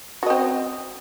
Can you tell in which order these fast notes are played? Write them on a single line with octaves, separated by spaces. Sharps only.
F#4 D#5 C4